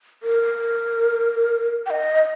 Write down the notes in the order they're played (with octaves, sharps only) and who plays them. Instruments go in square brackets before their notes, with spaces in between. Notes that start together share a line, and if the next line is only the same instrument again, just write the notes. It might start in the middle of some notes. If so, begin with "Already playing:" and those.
[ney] A#4
G5
D#5